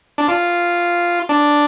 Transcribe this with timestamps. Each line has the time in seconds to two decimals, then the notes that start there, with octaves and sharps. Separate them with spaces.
0.18 D4
0.28 F4
1.29 D4